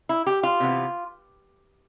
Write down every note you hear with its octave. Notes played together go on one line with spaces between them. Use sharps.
E4
G4
F4
C3 E3 B3